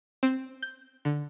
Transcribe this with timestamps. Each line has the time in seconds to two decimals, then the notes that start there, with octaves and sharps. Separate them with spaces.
0.23 C4
0.62 G6
1.05 D3